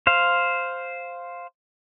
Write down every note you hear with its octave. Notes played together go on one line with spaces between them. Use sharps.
C5 F5